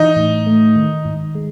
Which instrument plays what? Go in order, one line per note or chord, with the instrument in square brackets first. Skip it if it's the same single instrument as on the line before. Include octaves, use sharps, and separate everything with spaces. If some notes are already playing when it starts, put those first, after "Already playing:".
Already playing: [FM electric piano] E3 [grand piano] D#4
[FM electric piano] A2
A3
D#3
G#2
G#3